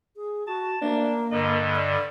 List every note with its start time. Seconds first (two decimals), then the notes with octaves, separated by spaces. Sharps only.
0.16 G#4
0.47 F#4 A5
0.82 A#3 D4
1.31 G2 D3 D#5
1.76 D5